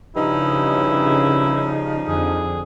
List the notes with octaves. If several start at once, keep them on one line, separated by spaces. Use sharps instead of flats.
G2 C#3 F3 G3 D#4 E4
F2 D3 G#4